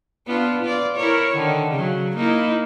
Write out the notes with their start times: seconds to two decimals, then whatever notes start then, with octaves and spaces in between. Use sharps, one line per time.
0.27 B3 D4 F4
0.61 F4 D5
0.96 E4 A#4 C#5
1.35 D3 D#3
1.71 C#3 F#3
2.16 A#3 D#4 E4